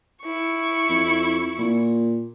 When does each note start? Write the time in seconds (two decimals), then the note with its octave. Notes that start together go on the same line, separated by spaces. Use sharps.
0.22 E4 C#6
0.89 F2
1.59 A#2